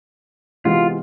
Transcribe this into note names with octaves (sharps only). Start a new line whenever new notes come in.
C3 E3 G#3 B3 F4